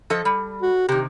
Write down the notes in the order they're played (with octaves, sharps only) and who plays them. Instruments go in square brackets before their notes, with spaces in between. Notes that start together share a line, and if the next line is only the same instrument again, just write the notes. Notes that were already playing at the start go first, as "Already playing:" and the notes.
[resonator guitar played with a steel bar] F3 A4 D#5
G3
[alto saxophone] F#4
[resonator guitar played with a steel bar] C3 D#3 [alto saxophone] G4